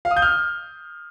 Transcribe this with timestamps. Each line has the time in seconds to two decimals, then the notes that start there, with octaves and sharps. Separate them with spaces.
0.05 F5
0.11 D#6
0.17 G6
0.22 F6